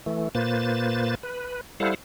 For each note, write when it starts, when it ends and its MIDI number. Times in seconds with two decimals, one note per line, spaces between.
0.06 0.29 52
0.06 0.29 57
0.35 1.15 46
0.35 1.15 58
0.35 1.15 71
0.35 1.15 72
0.35 1.15 93
1.23 1.61 71
1.80 1.95 55
1.80 1.95 64
1.80 1.95 69
1.80 1.95 72
1.80 1.95 77
1.80 1.95 78